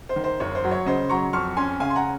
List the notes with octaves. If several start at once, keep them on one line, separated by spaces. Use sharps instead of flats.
C5
D#3
C5
F#1 C#5
C5
F#3
C#5
C#3 C5 D#5
F#3 A#5 C#6
F2 C#6 F6
C#4 G#5 C6
C#3 F5 G#5
C6
F#5 A#5